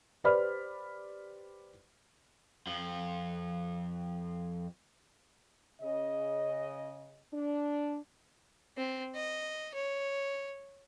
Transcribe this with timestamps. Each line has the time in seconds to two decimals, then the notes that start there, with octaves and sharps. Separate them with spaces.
0.24 G4 B4 C5 D5 B5 F6
2.67 F2 F3
5.81 C#3 D#5
7.33 D4
8.77 C4
9.15 D#5
9.74 C#5